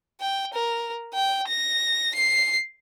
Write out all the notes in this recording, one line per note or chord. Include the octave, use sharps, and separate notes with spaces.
G5
A#4
G5
A#6
C7